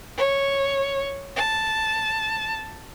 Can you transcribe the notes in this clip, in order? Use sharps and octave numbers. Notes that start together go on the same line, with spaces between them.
C#5
A5